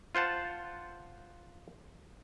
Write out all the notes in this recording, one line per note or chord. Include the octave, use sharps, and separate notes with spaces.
F4 C5 F#5 A5